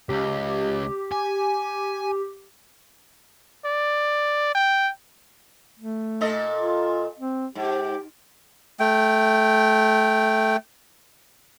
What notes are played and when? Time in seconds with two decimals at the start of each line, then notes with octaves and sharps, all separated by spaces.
0.09 C#2 G4
1.12 G#5
3.65 D5
4.55 G5
5.79 A3
6.21 A#2 A4 D#5
6.60 F4
7.19 C4
7.55 G#2 G4
8.80 A3 G5